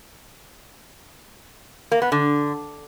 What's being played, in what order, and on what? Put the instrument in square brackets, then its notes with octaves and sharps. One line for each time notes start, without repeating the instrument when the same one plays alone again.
[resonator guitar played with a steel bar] A#3
B3
D3